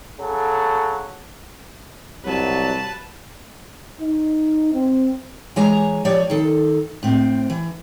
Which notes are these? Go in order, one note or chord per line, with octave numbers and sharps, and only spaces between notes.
C#3 F#3 A4
C2 F#3 B4 A5
D#4
C4
E3 G#3 C#5 G#5 A#5
F3 G4 C#5 D5
D#3 A4
A2 C4
E3